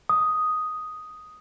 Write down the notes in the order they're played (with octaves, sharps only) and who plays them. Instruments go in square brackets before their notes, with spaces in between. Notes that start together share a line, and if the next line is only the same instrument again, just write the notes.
[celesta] D#6